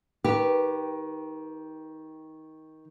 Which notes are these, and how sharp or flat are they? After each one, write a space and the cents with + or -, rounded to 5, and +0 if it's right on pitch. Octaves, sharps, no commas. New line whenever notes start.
D#3 +15 G4 +0 B4 -5